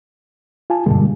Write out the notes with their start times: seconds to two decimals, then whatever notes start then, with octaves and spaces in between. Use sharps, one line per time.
0.70 F4 G#5 A5
0.86 G2 B2 D3 G3 G#3 A#3